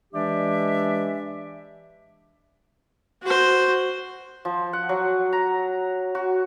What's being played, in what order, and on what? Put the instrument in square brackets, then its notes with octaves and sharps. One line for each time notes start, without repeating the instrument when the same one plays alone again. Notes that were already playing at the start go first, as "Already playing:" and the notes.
[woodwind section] E3 G#3 D4 G4 D5 E5
[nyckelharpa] F#4 C5
[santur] F3
F#5
F#3
A#5
F#4